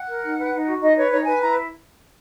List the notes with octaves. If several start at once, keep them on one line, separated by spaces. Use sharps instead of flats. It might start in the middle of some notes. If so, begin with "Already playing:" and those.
Already playing: F#5
A#4
D#4
B4
D#4
F#4
D#4 D#5
B4 C#5
D#4 C#5
B4 G#5
E4 A#5